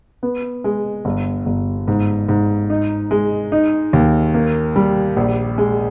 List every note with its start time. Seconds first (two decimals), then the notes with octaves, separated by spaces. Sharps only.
0.23 B3
0.64 G#3
1.05 G1
1.46 G1
1.88 G#2
2.29 G#2
2.70 D#4
3.11 G#3
3.52 D#4
3.93 D#2
4.34 A#3
4.76 G3
5.16 A#1
5.58 G#3